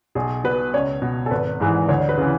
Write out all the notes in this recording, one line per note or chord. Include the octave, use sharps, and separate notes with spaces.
B1 G#4
B2 B4
C#2 C#5
B2
A4
G#1 B4
G#2 E3 G#4
D2 C#5
C#5
B4
C#3 E3